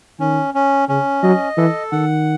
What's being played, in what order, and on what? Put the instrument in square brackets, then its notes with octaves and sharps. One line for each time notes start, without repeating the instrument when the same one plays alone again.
[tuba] D#3 [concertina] C#4
[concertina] C#4
[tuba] C#3 [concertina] C#4
[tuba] F#3 [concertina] D#5
[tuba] E3 [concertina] A4
[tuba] D#3 [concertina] F#5